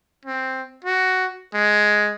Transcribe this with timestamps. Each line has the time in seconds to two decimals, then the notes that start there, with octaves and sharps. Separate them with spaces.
0.25 C4
0.84 F#4
1.54 G#3